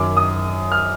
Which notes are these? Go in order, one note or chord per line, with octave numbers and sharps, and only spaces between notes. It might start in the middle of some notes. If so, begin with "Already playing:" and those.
Already playing: F#2 D#3 F#3 D6
D#6
F6